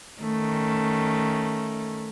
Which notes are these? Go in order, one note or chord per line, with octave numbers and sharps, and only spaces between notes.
D#3 A3 C#4